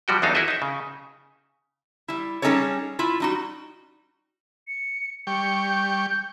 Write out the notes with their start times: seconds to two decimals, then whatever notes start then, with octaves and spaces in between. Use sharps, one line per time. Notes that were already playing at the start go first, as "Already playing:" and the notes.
0.08 F3 G3 F#4 G5
0.22 E2 F#3 D4 D#4 A4 F5
0.35 E4 F#4 G#4 A#4 D#5 E5
0.48 D#4 E5
0.62 C#3
2.08 G3 E4
2.42 G3 C#4 D#4 G#4 A4 C#5
2.99 E4 F4
3.20 G3 D#4 F#4
4.68 C#7
5.27 G3 G5 C#6 C#7
5.69 G6